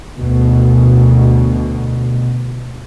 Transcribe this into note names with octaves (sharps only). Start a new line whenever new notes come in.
D2 B2